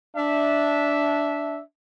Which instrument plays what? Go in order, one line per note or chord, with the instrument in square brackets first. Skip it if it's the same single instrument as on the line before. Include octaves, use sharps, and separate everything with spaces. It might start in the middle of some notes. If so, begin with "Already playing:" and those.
[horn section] D4 E5